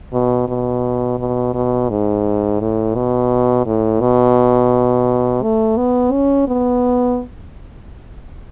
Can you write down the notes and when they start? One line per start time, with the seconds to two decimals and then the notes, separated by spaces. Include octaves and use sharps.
0.13 B2
0.48 B2
1.19 B2
1.54 B2
1.89 G#2
2.60 A2
2.95 B2
3.66 A2
4.01 B2
5.42 A3
5.77 B3
6.12 C#4
6.48 B3